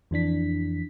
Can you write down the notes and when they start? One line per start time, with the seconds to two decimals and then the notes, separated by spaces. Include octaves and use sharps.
0.11 F2 E3 D4 B6